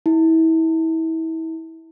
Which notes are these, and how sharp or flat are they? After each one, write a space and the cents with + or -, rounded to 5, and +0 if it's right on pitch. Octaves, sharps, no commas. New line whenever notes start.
E4 -30